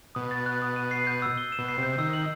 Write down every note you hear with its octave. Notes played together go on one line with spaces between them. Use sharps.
B2 D#6
A6
F#6
D#6
D#7
C7
G6
E6
G7
E7
B2
C7
C3
G6
D#3 E6
F#7